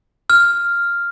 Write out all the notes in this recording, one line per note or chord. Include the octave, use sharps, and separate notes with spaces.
F6